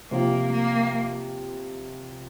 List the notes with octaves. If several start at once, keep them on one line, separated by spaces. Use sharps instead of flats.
C3 F3 A#3 C4 F4
A#3